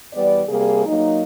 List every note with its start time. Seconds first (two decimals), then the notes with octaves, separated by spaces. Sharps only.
0.14 E2 G3 B3 D5
0.49 C3 G3 A#3 G#4
0.86 F#3 A#3 D#4